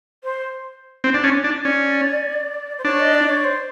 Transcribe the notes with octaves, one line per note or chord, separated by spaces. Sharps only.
C5
C4
D4
C#4
D4
C#4 D5
C5
D4 C#5
D#5
D5
C#5
C5